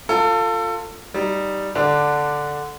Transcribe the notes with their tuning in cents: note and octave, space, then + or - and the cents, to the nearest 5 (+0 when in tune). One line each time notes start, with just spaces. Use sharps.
F4 +5 A4 +25
G3 -5 D#4 +0
D3 +0 D4 +0